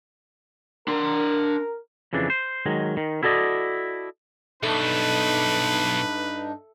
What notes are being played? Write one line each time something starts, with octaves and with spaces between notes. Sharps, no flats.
D4 A#4 C6
F2 C#3 E3 D4
C5
D#3 F#3 G#3
D#3
E4 F#4 A4 D5 D#5
B1 G2 A3 D4 D#4 B4